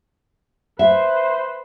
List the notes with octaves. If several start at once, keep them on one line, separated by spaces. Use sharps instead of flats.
B4 C5 E5